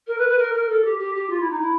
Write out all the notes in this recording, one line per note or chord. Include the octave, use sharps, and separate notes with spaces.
A#4
B4
B4
A#4
A#4
A4
G4
G4
G4
F4
E4
D#4
E4